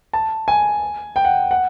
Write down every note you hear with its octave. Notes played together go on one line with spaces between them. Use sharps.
A5
G#5
G5
F#5
F#5